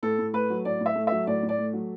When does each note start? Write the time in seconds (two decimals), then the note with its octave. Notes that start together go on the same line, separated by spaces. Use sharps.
0.03 A2 A4
0.19 A2
0.33 A3 B4
0.50 F#3
0.65 A2 D5
0.81 A2
0.86 E5
0.96 A3
1.07 F#3 E5
1.27 A2 D5
1.43 A2
1.49 D5
1.58 A3
1.73 F#3